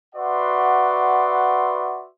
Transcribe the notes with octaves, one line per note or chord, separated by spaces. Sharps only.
F#4 B4 D5 E5 F#5 C6